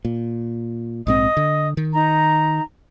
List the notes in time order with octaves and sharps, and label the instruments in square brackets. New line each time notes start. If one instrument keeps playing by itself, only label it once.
[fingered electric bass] A#2
[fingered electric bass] A#1 G#2 C4 [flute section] D#5 D#6
[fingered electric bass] D3
D#3
[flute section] D#4 A#5